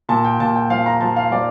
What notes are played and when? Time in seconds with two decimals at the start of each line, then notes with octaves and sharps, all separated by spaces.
0.09 A#2 A5
0.24 G5
0.40 A#2 A5
0.55 G5
0.70 F3 F5
0.86 A#5
1.01 F3 A5
1.16 F5
1.32 F3 D5